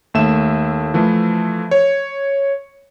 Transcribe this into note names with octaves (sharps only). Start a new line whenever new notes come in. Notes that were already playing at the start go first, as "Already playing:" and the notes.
D#2 A3 E5 E7
E3 F3 A3
C#5